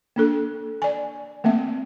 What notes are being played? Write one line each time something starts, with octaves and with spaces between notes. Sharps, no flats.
A#3 D4 A4
D5 G#5
A3 A#3 C4 E5